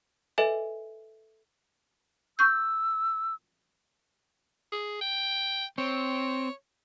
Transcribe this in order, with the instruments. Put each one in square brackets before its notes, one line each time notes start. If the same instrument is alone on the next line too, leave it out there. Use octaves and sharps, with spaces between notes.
[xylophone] A4 B4 D#5 E5 G#5
[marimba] C#6 G6 [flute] E6
[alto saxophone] G#4
G5
[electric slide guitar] C4 [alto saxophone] C#5